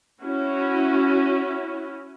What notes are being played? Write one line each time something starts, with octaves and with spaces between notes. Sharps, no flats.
C#4 E4 F#4